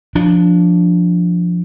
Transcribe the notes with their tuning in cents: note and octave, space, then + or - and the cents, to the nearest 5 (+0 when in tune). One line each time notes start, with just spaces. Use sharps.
F3 +0 D4 -5